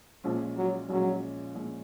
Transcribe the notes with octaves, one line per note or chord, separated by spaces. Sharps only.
A#1 A#2 F3 G#3 C#4
F#3
A#1 A#2 F#3 G#3 C#4
A#1 A#2 G#3 C#4